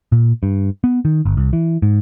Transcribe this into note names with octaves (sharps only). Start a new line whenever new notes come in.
A#2
G2
B3
D#3
G1
C2
E3
G#2